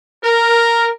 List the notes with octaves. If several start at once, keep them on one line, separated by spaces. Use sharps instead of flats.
A#4